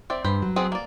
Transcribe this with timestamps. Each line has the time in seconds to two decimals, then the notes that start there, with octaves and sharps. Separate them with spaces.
0.10 C4 D5 E5
0.25 G2 C5 B5
0.42 F#3
0.56 B3 C4 G#4
0.72 A#3 D5